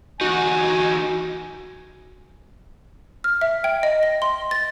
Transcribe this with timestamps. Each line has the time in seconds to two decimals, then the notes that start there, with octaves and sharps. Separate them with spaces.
0.21 E2 D#4 F#4 G#5
3.24 F6
3.41 E5
3.64 G5
3.83 D#5
4.03 A#6
4.22 C6
4.51 A6